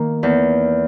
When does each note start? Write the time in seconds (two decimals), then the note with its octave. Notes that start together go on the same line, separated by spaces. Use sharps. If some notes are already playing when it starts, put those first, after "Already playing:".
Already playing: D#3 A#3
0.23 E2